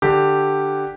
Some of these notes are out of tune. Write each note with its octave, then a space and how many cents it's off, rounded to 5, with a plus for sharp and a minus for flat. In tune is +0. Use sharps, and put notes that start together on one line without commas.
D3 +15 G4 +0